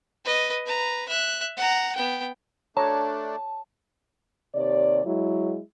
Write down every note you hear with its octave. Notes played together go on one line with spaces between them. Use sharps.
B4 D#5
B4 A#5
E5 F#6
F#5 A#5
B3 G5
A3 D4 C#5 A5 A#5
D#2 C3 C#5 D5
F#3 G#3 E4